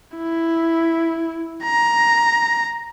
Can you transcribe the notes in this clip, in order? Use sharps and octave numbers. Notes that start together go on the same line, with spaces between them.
E4
A#5